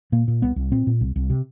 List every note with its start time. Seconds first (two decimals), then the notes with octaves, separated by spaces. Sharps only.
0.12 A#2 A#3
0.28 A#2
0.42 C2 B3
0.56 C2
0.71 A#2 C4
0.87 A#2
1.01 C2
1.16 C2
1.30 C3